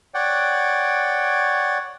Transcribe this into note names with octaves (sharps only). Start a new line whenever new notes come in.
C#5 D5 F#5 G5